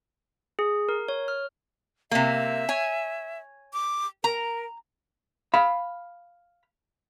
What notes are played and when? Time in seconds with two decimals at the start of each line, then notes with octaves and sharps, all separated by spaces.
0.59 G#4
0.89 A#4
1.08 C#5
1.28 F6
2.11 C3 A#3 E5
2.69 C#5 G#5
3.73 D6
4.24 A#4 A#5
5.54 F5 B5